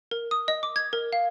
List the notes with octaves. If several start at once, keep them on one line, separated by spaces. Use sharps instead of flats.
A#4
D#6
D#5
D6
G#6
A#4
F5